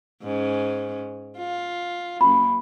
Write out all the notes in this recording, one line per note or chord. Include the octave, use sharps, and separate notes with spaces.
G#2 C#4
F4
F#2 A#3 B5